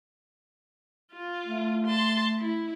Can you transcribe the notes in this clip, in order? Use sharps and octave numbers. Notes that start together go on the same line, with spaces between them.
F4
A3
A5 C6
E4